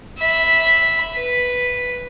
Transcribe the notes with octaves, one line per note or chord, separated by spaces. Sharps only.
E5 B5
B4